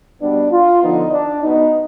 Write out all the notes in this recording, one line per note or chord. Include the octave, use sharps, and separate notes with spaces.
B2 G3 B3 D4
F4
D3 F3 B3 D#4
D4
B2 B3 D#4